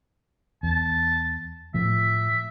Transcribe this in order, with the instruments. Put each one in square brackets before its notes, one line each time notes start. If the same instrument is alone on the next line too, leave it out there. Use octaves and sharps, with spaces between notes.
[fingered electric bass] E2 [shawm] A5
[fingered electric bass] A2 F3 [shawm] E5